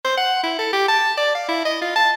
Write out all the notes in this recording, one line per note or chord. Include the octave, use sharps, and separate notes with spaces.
C5
F#5
E4
A4
G4
A5
D5
F5
E4
D#5
F4
A5